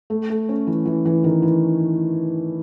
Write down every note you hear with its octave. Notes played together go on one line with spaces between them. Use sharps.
A3
A3
C#4
E3
E3
E3
D#3
E3